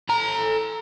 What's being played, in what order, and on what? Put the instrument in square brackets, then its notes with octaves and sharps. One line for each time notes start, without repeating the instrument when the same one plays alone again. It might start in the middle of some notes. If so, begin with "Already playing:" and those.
[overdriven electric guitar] A4 A#5